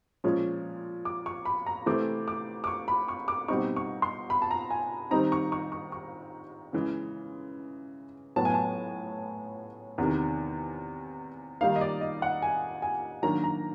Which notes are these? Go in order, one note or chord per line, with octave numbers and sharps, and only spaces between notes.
A#2 F3 G#3 C#4
D6
C#6
B5
A#5
C3 E3 A3 C4 D6
D6
D6
C#6
B5
C#6
D6
B2 G3 C4 D#4 C#6
C#6
C6
B5
A5
A#5
G#5
D#3 G3 C4 D#4 A#5
C#6
C#6
C#6
C#6
C#3 E3 G#3
A2 F#3 B3 A5
G#5
A5
E2 C3 D#3
D#3 G3 A#3 D#4 F5
D#5
D5
D#5
F#5
G#5
G#5
D#3 F#3 A#3 D4 A#5
A#5